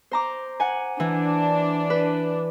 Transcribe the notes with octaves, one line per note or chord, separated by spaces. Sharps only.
C5 A#5 D6
F#5 G#5
E3 D4
B4